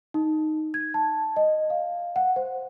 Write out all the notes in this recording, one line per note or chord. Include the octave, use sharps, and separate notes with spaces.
D#4
G#6
A5
D#5
F5
F#5
C5